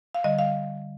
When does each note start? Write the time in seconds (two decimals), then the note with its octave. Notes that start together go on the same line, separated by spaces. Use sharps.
0.14 F5
0.24 D3 G3 D#5
0.39 F5